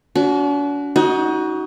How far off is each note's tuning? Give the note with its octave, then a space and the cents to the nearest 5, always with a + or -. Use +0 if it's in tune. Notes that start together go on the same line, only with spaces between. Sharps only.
D4 -45 F#4 +0
D#4 +35 F#4 +15 D#5 +0